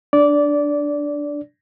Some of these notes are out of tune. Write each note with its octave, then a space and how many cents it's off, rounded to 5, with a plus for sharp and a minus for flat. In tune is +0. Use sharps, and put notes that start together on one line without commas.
D4 +0 D5 -15